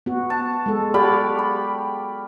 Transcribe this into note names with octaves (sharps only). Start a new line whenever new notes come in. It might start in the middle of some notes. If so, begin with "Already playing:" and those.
B3 F#4
A5
G#3 A4
F#4 G4 D5 F5 B5
B5